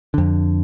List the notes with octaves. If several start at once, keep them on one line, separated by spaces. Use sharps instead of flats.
F2 D3